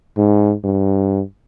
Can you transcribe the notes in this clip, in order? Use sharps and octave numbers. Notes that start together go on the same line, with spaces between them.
G#2
G2